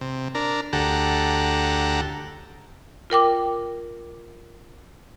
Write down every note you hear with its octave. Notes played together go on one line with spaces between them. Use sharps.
C3
D4 A#4
D2 G4 A4 F#5 A#5
F4 A#4 G5 D6